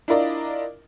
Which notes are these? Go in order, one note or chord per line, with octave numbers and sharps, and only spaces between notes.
D4 E4 F4 A#4 D5 D#5